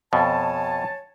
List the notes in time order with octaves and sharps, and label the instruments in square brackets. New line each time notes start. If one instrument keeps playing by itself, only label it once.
[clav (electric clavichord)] F2 B2 [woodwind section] C#5 G#5 A5